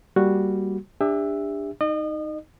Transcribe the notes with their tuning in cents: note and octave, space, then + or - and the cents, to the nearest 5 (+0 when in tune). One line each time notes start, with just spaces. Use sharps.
G3 +0 A#3 +0 F#4 +0
D4 +0 G4 +40 E5 +0
D#4 +0 D#5 -35